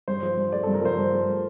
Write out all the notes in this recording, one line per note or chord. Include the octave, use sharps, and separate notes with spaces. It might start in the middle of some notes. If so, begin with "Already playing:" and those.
G2 C5
F3
G2
A3 D5
G2 A4
A#4
F3 C5
G2
A3